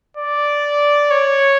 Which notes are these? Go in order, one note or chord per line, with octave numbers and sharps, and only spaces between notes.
D5
C#5